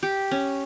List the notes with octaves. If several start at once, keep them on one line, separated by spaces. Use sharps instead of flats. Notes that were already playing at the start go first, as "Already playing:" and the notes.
G4
C#4